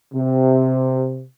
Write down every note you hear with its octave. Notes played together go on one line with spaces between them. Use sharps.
C3